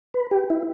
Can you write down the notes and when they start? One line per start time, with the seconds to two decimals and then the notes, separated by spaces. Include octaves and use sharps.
0.14 B4
0.31 G4
0.50 E4